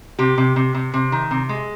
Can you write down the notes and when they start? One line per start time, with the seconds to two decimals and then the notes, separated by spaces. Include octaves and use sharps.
0.19 C3 G4
0.38 C3
0.56 C3
0.74 C3
0.94 C3
1.12 D#3
1.31 C3
1.49 G#3